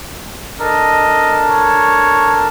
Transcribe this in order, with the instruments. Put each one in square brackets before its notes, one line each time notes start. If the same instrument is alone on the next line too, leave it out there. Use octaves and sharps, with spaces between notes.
[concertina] D4 A4 A#4 [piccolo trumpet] D#5
[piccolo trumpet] C#5